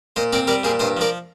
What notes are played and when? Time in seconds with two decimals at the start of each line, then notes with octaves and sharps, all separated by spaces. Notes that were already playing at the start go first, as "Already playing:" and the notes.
0.16 A#2 C5 D#5
0.33 C4 A#4 D5
0.47 G3 A#4 D5
0.64 A#2 G#4 C5
0.79 G2 C5 D#5
0.97 F3 A#4 D5